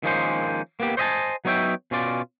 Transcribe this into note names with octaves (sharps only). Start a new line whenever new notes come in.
D#3 F3 G#3 A#3 C#4 C5
A#3 B3 G4
C5 C#5 D#5 E5 G#5 A5
F#3 B3 D#4 C#5 E5 G5
B2 C#4 F4 D5